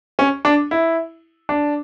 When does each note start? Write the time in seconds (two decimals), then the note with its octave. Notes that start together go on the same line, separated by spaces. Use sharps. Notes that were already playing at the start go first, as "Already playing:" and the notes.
0.19 C#4
0.45 D4
0.71 E4
1.49 D4